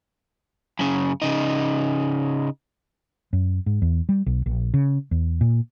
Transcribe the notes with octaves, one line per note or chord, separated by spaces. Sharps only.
F#2 C#3
C#3 D#4
F#2
G#2
E2
G3
B1
A#1
C#3
E2
A#2